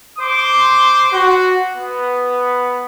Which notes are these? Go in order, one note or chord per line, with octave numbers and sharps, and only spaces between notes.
C5 C6 D6
F#4
B3